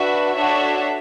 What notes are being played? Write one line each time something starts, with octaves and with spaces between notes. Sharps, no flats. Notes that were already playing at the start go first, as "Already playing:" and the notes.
Already playing: D4 F#4 B4 E5
D4 F#4 A4 C#5 E5